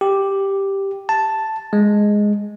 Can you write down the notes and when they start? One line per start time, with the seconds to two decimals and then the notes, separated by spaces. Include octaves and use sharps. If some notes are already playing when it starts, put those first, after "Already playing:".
0.01 G4
1.09 A5
1.73 G#3